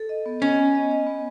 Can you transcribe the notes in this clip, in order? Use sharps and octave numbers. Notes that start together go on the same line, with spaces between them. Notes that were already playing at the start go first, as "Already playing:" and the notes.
Already playing: A4
D#5
B3
C#4 D#5
B3
D#5
D#5
B3